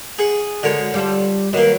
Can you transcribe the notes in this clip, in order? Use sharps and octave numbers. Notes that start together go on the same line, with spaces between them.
G#4 F#5
D3 G#3 F#4 A#4 C#5
G3 F4 A4
D#3 F#3 A#3 B3